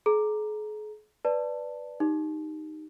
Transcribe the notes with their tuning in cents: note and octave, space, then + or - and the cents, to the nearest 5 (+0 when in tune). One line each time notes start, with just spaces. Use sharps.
G#4 +45 A#5 +0
B4 +0 D5 +0 A5 +10
D#4 -5 G4 +0